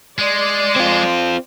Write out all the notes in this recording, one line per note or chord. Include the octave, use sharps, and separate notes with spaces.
G#3 D5 C6
C4 F4